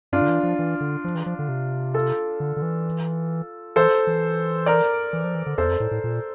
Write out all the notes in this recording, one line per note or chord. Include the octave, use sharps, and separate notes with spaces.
G2 D4 F4
D3
E3
F3
E3
D3
F3
E3
F3
D3
C3
F4 A4
D3
D3
E3
E3 A4 C5
E3
A#4 D5
E3
F3
E3
D3
E2 A4 C5
F2
A2
A2
A#2